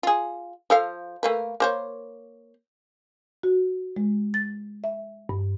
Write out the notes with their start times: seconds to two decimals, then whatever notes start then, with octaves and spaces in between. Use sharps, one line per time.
0.03 F4 G#4
0.70 F3 A4 F5
1.23 A3 A#3 B4
1.60 A#3 C5 C#5
3.43 F#4
3.96 G#3
4.34 A6
4.84 E5
5.29 G2